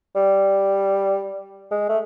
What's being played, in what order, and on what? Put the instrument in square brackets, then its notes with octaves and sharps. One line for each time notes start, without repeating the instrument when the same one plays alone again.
[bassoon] G3
G#3
A3